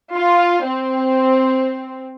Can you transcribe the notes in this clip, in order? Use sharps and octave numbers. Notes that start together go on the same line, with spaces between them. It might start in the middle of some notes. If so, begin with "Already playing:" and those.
F4
C4